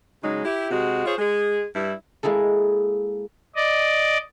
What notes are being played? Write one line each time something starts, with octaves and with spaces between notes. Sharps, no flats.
C#3 F#3 G#3 D#4
E4 G4
C3 G#3 F#4
F4 G#4 C5 C#5
G#3 G#4
G2 E4
G#3 A#3 E4 G#4 A4
D5 D#5